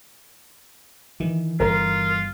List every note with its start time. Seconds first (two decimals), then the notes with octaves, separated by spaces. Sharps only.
1.20 D#3 E3
1.60 G1 D3 F4 A#4